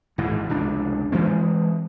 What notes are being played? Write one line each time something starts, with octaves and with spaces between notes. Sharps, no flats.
G#1 G#2 E3
F1 C#2 D4
E3 G#3 C4